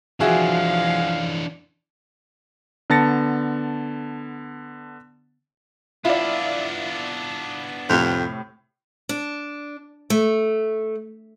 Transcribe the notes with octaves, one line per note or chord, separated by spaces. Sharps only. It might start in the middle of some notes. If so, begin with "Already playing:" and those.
E3 F3 D4 F#4 G#4 E5 F5
D3 B3 A5 A6 A#6 C#7
B3 D4 E4 F4 D5
F2 A2 C3
D4
A3